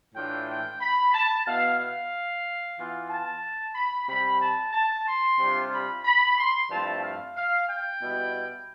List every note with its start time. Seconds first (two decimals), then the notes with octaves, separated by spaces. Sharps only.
0.15 A2 E3 A3 D4 F4 G5
0.48 G5
0.81 B5
1.14 A5
1.46 B2 B3 E4 F5
1.79 F5
2.78 E3 B3 F4
3.10 A5
3.75 B5
4.08 C3 G3 C4 B5
4.42 A5
4.73 A5
5.06 C6
5.40 C3 G3 D4 F4
5.72 B5
6.05 B5
6.38 C6
6.70 G2 F3 A3 C4 E4 A5
7.03 F5
7.36 F5
7.68 G5
8.02 B2 G3 B3 E4